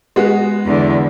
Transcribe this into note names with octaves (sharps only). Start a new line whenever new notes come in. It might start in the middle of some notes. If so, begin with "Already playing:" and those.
G#3 B3 F#4
E2 D3